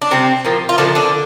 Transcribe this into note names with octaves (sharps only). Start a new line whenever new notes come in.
D4
C3 G3 C4
A#2 F3
F4
A#2 D3 F3 D4
D3 D4